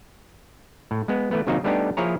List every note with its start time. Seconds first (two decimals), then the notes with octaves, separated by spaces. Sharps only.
0.91 A2
1.08 G#3 B3
1.31 E3 A3 B3
1.47 C3 D#3 F#3 A#3 C4 D#4
1.64 G3 A3 B3 D4 D#4 G4
1.97 F3 A#3 E4 G#4 C#5 A#5